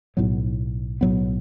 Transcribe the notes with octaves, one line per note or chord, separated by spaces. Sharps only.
B1 A2 F#3 B3
B1 A2 F#3 B3